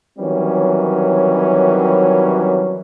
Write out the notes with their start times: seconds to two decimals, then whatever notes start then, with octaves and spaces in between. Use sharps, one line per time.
0.18 D#3 E3 F#3 G3 C4 C#4